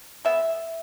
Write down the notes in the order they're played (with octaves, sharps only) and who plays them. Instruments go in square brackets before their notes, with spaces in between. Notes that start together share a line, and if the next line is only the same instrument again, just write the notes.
[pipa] G#3 B3 E5